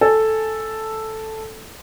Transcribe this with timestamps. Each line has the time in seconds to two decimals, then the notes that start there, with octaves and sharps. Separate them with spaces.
0.01 A4 G#5